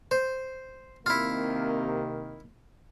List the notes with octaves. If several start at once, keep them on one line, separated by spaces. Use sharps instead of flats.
C5
C3 D#3 A#3 E4 F4